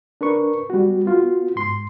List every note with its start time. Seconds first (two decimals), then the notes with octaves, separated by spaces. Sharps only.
0.21 D4 A#4 B4 C#6
0.70 G3 B3 F#4
1.06 B3 F4 F#4
1.56 G#2 C6